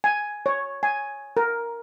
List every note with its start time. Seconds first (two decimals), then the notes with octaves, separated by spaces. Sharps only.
0.04 G#5
0.46 C#5
0.83 G#5
1.37 A#4